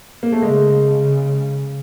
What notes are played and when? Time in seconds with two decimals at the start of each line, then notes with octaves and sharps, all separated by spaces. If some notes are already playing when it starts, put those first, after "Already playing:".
0.23 A#3
0.32 A3
0.42 C#3 G#3